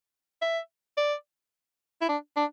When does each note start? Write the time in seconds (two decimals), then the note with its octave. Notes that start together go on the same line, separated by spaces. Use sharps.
0.42 E5
0.97 D5
2.01 E4
2.08 D4
2.36 D4